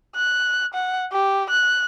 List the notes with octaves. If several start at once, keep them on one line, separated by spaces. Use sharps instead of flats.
F#6
F#5
G4
F#6